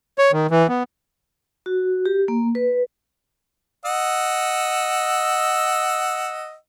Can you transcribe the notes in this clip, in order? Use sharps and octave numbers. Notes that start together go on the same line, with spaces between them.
C#5
D#3
E3
B3
F#4
G4
A#3
B4
D#5 F#5 E6